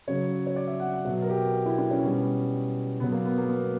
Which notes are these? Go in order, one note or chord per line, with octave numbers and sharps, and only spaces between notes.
C#3 F#3 C#5
C#5
D5
E5
F#5
F#5
B2 F#3 E5
A#4
G4
E4
D4
C#4
B2 G3
B2 F#3 B3
A#3
B3
A#3
B3